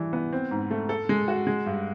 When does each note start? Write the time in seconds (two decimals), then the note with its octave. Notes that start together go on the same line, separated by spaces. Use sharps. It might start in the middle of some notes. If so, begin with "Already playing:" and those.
Already playing: E3 G3 D4
0.13 B3
0.33 C4
0.51 G#2
0.71 A3
0.89 A4
1.09 G#3
1.28 F#4
1.47 G#3
1.66 G2